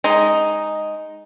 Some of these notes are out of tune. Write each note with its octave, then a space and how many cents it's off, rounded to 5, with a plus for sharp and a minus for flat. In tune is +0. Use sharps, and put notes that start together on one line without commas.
G#3 +0 D#4 +0